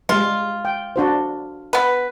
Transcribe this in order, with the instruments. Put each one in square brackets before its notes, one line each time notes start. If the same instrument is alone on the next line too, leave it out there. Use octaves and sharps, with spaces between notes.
[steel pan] G3 G#3 [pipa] F4
[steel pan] G5
D4 F#4 C5
[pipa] B3 B4